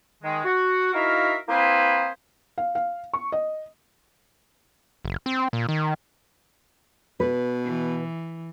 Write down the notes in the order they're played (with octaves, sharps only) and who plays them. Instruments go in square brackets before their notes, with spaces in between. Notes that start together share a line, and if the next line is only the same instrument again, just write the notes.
[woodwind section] D#3 G#3
F#4
D#4 E4 F#4 A#4 E5 F5
A#3 C4 E4 G#4 B4 C5
[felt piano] F5
F5
C#6
D#5
[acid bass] F#1
C4
A#2
D#3
[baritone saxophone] B2 [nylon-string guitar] B4
[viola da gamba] E3